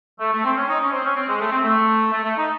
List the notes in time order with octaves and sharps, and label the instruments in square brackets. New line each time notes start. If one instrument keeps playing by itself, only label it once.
[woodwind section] A3
A3
C4
C#4
D#4
C#4
C4
C#4
C4
G#3
A3
C4
A3
A3
A3
D#4